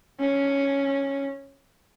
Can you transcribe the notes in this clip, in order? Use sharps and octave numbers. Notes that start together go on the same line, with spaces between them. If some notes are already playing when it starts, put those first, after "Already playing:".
C#4